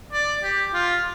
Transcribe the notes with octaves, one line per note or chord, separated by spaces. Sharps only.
D5
G4
F4